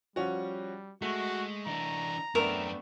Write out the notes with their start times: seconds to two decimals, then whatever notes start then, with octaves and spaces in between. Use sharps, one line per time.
0.16 F3 G3 C#4 F#4
1.02 G#3 A3 F#4
1.66 E3 D4 A#5
2.35 F#2 A3 B3 C4 D4 A#4 E5